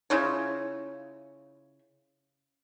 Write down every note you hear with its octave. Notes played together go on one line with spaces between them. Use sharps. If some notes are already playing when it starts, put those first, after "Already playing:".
C#3 E4 F4 C#5